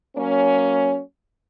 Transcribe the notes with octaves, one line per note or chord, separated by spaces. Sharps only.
F#3 A#3 C#4